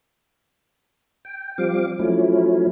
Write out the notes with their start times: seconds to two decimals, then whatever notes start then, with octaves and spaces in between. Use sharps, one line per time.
1.25 G5
1.58 F3 G3 C4 F5 D6
1.99 F3 F#3 A3 C#4 E4